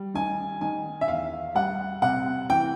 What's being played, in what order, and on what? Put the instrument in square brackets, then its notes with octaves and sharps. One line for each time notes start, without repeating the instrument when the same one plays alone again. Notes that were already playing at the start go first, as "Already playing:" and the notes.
Already playing: [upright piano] G3
D#3 G#5
D#3 G#5
E5
E2 F5
G3 F#5
C3 F#5
E3 G5